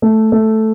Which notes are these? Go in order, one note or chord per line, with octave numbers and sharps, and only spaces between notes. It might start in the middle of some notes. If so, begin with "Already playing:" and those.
A3
A3